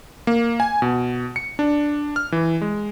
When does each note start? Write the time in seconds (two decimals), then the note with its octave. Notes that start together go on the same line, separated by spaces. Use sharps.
0.27 A#3
0.60 G#5
0.82 B2
1.36 C#7
1.59 D4
2.16 F6
2.32 E3
2.61 G#3